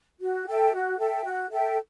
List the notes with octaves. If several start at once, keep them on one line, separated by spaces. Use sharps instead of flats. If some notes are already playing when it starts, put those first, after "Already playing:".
F#4
A4 E5 G5
F#4
A4 E5 G5
F#4
A4 E5 G5